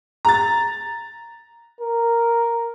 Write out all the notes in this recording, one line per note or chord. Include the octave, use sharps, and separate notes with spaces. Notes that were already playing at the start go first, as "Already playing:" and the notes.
A#5 A6
A#4